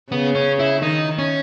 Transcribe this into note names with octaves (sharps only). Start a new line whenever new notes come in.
C#3 B3
C#4
E4
D#3 D#4
C#4